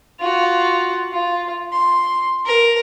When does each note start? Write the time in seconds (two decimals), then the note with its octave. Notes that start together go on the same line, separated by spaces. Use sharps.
0.20 F4 F#4
1.12 F4
1.73 C6
2.46 A#4